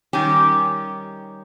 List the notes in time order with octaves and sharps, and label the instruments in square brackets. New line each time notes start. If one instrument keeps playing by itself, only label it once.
[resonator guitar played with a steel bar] D#3 G3 C#4 G4